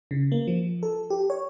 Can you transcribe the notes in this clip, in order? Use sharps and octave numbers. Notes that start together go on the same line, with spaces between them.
C#3
A#3
F3
A4
G4
C#5